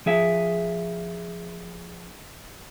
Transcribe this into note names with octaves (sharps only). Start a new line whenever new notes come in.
F3 G#4 E5